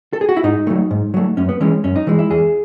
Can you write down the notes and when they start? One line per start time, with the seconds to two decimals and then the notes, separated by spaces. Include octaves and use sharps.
0.13 A4
0.21 G#4
0.29 F#4
0.37 E4
0.44 G#2 D#4
0.67 F#3 A3
0.91 G#2
1.14 F#3 A3
1.37 F#2 C#4
1.49 B3
1.60 E3 G#3 C#4
1.84 F#2 C#4
1.96 D#4
2.07 E3 G#3
2.19 E4
2.30 E2 G#4